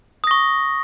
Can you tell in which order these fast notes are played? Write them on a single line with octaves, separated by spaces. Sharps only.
D#6 A#6 C#6